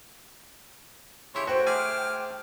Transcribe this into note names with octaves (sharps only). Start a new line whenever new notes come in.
C#3 E4 G4 C#5 C6
A3 F#4 C5 G5
A3 G#4 G#5 D6 F6